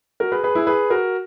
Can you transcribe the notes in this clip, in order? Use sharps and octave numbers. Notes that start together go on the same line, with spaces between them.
F#4 A#4
G#4 B4
G#4 B4
E4 G#4
G#4 B4
F#4 A#4